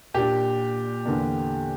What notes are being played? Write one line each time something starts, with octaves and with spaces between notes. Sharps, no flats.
A#2 A#3 D4 G4
E2 D3 A#3 D4